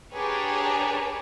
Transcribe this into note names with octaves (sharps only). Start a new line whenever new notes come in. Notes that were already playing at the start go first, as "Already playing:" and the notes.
D4 G4 G#4 A#4 B4 C#5